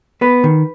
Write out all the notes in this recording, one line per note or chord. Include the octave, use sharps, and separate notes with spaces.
B3 B4
D#3